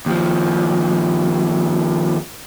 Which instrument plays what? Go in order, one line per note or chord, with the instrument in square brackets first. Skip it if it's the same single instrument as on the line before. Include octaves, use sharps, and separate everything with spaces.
[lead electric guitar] D#2 F3